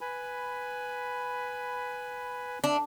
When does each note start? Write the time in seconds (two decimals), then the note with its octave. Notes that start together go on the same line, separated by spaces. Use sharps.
0.01 B4 G#5 B5
2.64 D4 E5